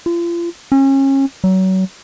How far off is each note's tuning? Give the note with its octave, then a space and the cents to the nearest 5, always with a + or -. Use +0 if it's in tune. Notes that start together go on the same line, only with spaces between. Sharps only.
F4 -35
C#4 -30
F#3 +30